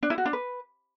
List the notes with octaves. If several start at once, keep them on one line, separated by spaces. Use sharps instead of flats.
D4
E4
F#4
D4
B4